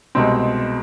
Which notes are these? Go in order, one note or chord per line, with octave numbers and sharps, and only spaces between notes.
C2 B2 G#3 C4